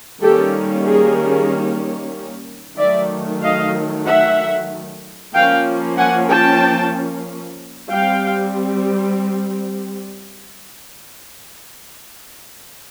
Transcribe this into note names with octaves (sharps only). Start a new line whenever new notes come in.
D#3 G3 A#3 C#4 G4 A4
G#4 A#4
D#3 F#3 A3 D5 E5
D#5 F5
E5 F#5
F3 A#3 C#4 F5 G5
F#5 G#5
G5 A5
G3 C4 F5 G5